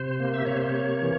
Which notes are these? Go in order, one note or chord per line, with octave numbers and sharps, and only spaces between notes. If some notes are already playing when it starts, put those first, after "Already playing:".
Already playing: C3 C5
A#3
E5
C3 C#5
C5
C#5
A#3
E3